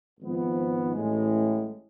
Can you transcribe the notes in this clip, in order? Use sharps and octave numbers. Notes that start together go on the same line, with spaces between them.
G#1 G#2 F3 B3
A1 A2 G#3